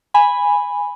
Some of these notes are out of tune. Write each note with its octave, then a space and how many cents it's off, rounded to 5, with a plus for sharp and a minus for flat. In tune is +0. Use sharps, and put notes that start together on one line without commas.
G#5 -10 B5 +0